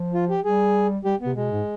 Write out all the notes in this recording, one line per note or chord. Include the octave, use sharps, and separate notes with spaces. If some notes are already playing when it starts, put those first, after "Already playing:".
Already playing: F3
F4
G4
G3 G#4
G3 G4
C3 B3
B2 G#3
G#2